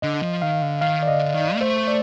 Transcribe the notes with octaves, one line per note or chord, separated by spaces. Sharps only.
D3 D#5
F3
D#3 F5
D3
D#3 F5
D5
D3 D#5
D#3
A#3
A3 C5
D5